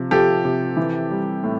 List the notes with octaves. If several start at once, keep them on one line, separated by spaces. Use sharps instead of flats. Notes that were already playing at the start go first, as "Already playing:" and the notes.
Already playing: C3 F3
F3 G4 A4
C3
E3
G3
A2